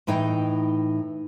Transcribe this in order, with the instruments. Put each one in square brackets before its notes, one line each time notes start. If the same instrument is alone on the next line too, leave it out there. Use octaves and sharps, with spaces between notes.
[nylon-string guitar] A2 E3 D#4 D#5 G5